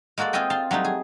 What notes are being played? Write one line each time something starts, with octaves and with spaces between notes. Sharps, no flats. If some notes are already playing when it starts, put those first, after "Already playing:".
G#3 A#3 F#4 A4 D5
C4 F4 G#4 D#5 G5
F4 A5 C6
F#3 G3 A3 D#4
G#4